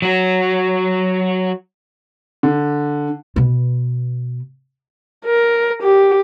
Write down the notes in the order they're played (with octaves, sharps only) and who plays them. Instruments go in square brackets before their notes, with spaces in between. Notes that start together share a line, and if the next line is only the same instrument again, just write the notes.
[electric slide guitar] F#3 F#4
[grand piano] D3
[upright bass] B2 B3
[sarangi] A#4
G4